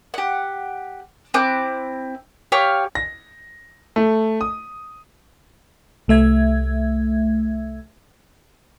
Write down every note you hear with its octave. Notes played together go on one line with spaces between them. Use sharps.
G4 F#5
C4 E4 D6 F#6
G4 C#5 F5
A#6
A3
D#6
C2 A3 E5 G#6